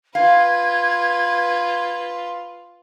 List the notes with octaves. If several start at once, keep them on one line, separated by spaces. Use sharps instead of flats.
F4 B4 F5 G#6